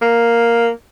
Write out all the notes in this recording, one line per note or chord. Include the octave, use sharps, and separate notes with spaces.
A#3